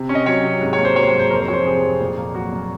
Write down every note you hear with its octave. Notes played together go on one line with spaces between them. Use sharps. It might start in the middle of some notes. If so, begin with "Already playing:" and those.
Already playing: C3
C#4
D#5
F#3 C#5
C3
G#2
C#5
A#3
C5
F#3 C#5
C5
C#5
G#2
C5
F2 A#4
C5
F3 C#5
C5
C3 G#4
F2
A#2
A#3
F#3 F#4
A#2